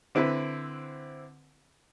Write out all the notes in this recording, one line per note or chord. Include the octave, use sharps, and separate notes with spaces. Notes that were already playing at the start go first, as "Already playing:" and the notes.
D3 C4 E4 B4